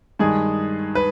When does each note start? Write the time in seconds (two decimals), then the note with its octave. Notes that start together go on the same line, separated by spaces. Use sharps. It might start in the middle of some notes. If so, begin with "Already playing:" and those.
0.19 G2 D#3 G#3 G#4
0.95 B4